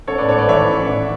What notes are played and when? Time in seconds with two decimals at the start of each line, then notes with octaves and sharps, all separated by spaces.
0.07 A1 A4 C#5
0.18 B4 D5
0.28 G#2 A4 C#5
0.39 B4 D5
0.49 E3 C#5 E5
0.68 A1
0.89 D4